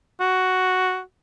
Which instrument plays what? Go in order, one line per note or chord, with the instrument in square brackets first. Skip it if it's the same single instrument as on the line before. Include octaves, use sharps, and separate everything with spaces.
[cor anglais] F#4